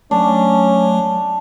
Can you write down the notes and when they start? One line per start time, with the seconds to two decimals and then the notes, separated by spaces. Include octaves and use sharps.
0.11 F#3 A3 C#4 D4